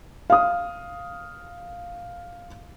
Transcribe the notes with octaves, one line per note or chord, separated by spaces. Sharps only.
F5 D#6